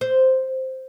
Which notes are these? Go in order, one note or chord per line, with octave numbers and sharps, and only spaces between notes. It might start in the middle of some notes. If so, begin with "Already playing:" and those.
C5